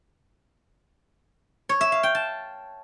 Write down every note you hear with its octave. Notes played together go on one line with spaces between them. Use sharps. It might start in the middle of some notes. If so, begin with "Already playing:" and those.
C#5
E5
F5
G5
A5